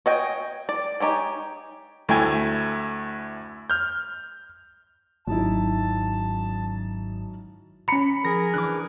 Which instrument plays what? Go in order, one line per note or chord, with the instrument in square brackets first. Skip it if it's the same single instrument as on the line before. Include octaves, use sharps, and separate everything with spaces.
[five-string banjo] C#5 D#5 G5 G#5
D5
D#4 G4 C#5 G#5
[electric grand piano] D2 A3 E4 G5 G#5 G#6
F6 G6
[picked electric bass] G#1 [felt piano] F#2 D#4 E4 [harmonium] A5
[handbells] C#4 A#5 [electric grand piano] B5 C#7
[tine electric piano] F3 [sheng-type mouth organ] G#4 A#4 [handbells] A#6
[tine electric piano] E3 D4 [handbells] D6 F#6